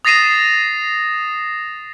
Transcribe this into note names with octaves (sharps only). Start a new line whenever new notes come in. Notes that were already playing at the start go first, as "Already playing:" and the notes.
D#6 A6 A#6 C7 D#7 E7